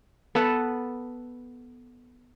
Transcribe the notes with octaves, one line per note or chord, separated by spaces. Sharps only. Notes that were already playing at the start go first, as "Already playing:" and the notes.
B3 A4 B4 F#5